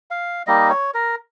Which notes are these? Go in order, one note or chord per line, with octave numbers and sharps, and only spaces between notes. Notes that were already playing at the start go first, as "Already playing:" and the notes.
F5
G3 A#3 D#4 D#5
C#5
A#4